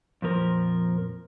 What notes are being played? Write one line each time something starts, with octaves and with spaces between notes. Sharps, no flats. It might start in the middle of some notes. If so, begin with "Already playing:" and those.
F2 A#2 F3 A#4